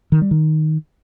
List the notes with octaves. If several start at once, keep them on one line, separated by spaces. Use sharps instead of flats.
D#3
G3
D#3